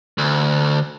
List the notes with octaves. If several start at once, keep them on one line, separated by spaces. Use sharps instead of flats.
D2